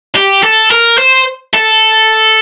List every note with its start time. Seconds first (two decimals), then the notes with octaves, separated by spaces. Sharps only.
0.15 G4
0.43 A4
0.71 A#4
0.98 C5
1.54 A4